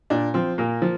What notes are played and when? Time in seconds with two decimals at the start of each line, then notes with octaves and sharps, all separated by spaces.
0.10 A#2 D4
0.34 F3 C4
0.58 A#2 A#3
0.82 F3